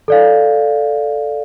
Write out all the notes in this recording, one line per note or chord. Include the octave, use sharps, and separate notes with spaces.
A4 D5 F5